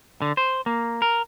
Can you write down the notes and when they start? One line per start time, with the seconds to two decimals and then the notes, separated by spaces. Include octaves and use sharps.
0.22 D3
0.37 C5
0.66 A#3
1.02 A#4